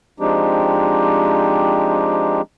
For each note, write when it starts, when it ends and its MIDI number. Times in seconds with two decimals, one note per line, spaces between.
0.20 2.42 53
0.20 2.42 56
0.20 2.42 60
0.20 2.42 62
0.20 2.42 63
0.20 2.42 67